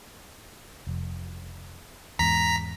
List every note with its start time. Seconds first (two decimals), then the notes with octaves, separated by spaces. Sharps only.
0.87 F1
2.19 E2 G#2 A#5 B6